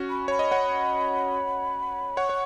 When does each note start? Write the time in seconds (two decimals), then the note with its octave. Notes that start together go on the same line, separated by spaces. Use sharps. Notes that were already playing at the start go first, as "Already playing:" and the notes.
Already playing: C#4 F#4
0.10 B5
0.28 C#5 B5
0.39 D#5
0.51 C#5 F#5
2.17 C#5 F#5 C#6
2.29 C#5